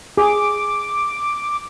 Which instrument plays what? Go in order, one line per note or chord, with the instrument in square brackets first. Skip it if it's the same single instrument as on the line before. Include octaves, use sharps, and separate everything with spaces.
[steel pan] G#4 [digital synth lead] D6